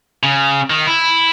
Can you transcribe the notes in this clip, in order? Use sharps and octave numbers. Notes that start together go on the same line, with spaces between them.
C#3
D#3
E4